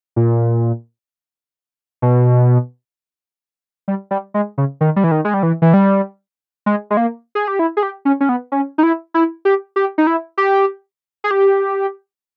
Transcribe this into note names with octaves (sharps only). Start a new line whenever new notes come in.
A#2
B2
G3
G3
G#3
C#3
D#3
G3
E3
D#3
G#3
G3
E3
E3
G3
G#3
G#3
A#3
G#4
G4
E4
G#4
G4
C#4
C#4
B3
C#4
D#4
E4
E4
G4
G4
D#4
E4
G4
G#4
G4